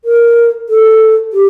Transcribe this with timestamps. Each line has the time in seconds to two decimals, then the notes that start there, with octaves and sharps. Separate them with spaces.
0.05 A#4
0.69 A4
1.33 G4